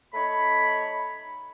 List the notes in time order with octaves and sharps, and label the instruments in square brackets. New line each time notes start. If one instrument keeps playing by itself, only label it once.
[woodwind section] A3 D#4 C#5 B5